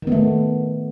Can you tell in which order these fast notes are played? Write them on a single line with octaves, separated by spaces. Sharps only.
D#3 B3 A3